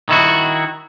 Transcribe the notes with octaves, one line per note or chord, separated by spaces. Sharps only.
D#3 E4 F#4